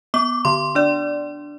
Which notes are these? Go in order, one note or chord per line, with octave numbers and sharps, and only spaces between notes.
B3 D6
D3 C6
D4 D5